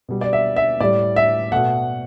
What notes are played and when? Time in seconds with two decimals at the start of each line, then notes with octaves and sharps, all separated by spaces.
0.09 B2 G3
0.21 D5
0.33 E5
0.56 E5
0.80 A2 G3 D5
1.16 E5
1.52 B2 A3 F#5